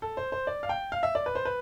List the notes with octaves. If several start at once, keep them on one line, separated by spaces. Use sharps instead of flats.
A4
C5
C5
D5
F5
G5
F5
E5
D5
B4
C5
B4